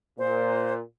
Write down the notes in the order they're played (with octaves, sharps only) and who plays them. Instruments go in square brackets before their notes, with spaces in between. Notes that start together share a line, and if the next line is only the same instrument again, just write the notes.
[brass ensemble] A#2 [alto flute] C5